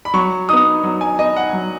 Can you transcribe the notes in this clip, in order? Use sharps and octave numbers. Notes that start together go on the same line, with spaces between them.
B5
F#3 C#6
B3 D#4 D#6
F#3
G#5
B3 D#4 D#5
F#5
F#3